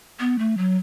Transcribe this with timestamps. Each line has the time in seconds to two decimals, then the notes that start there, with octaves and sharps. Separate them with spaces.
0.20 B3
0.39 A3
0.57 F#3